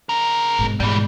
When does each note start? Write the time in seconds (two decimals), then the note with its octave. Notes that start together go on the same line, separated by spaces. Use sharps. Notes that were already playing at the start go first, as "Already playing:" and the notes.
0.09 C#3 A#4
0.59 G#2 B2
0.80 G#2 B2 E3 G3